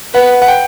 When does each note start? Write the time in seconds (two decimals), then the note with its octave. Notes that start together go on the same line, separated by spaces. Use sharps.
0.14 B4 F#5
0.42 F#5
0.48 G5